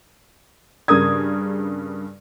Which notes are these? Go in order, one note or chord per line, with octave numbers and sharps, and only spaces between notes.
G2 C#3 A#4 D#6 G#6